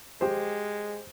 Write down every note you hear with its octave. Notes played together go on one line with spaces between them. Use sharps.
G#3 G4 C5